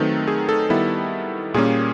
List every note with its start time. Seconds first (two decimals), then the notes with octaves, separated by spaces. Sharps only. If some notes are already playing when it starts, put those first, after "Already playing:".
Already playing: D#3 F#3 A3 C4 D#4 A4 B4
0.27 G#4
0.49 A4
0.70 D#3 G3 B3 E4
1.54 A#2 G3 A#3 C#4 G#4